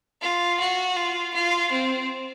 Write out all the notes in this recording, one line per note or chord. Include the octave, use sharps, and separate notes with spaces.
F4
F#4
F4
F4
C4